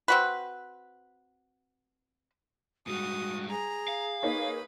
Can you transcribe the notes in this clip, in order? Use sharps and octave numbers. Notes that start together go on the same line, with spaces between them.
C4 F#4 B4
G#2 G3 F#4 D#6
G#4 A#5
F5
A#3 D#4 B4 C#5 B5